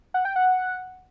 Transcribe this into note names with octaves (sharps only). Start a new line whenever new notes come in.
F#5
G5
F#5